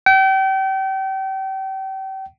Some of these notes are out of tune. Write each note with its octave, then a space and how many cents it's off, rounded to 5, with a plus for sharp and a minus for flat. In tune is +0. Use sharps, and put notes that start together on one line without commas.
G5 -35